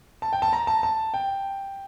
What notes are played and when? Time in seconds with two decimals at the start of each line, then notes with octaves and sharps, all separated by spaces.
0.22 A5
0.33 G5
0.42 A5
0.53 A#5
0.67 A5
0.83 A5
1.14 G5